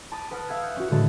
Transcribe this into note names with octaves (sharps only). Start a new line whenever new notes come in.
A5 B5 D6 D#6 A#6 D#7
B4 F#5 A5 D#6 F6 A#6
E5 F5 E6 G#6
F#6 G6 C#7
C#4 F#4
A2 D3 G#3 A3 F#4 A5